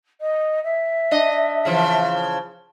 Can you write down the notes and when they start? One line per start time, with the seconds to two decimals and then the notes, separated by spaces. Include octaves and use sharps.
0.20 D#5
0.63 E5
1.11 D4 D#5
1.65 C#3 E3 F3